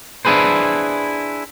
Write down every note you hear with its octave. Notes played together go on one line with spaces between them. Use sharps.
D4 E4 G#4 B4 C5